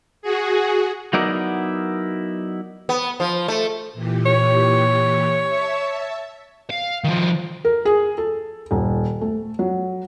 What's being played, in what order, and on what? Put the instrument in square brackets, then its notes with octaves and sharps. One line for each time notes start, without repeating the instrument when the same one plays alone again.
[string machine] F#4 G#4
[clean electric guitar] F#3 B3 D#4 E4 A#4 D5
[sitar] B3
F3
A3
[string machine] A#2 E3 G4
[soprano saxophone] C#5
[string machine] E5 A5
[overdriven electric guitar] F5
D#3 F3
[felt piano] A#4
G#4
A4
D#1
A3
F#3